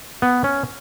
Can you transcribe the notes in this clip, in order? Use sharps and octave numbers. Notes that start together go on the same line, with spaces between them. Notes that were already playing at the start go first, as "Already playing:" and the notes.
B3
C#4